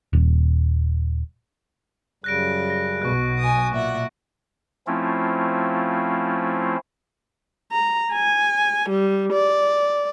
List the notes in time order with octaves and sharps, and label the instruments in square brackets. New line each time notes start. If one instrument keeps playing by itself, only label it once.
[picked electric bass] D#1
[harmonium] F#2 C#3 G3 [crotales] F#6 A#6 D7
[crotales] A#6
[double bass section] B1 B2 [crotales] C#6 F#6
[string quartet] G#5 D#6
[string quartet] A#2 E5 F#5 [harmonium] D5
[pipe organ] F3 A3 C4 C#4 E4 F4
[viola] A#5
G#5
G3
D5